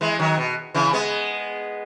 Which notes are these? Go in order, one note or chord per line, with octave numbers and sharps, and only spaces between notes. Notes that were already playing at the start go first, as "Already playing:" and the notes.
E3 G#3
D#3 F#3
B2
C#3 E3
G#3 B3